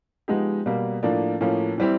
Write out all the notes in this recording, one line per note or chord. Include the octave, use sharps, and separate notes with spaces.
F3 G#3 B3 D#4 G4
B2 G3 A#3
A2 F3 A#3 D4
A2 F3 A#3 C#4
E3 G3 C4 E4 G4